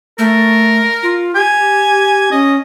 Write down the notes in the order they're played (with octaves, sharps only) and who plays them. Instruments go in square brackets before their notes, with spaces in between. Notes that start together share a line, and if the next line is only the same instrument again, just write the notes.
[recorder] A3 [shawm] A#4
[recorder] F4
[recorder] G4 [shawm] G#5
[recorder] C#4 [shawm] D#5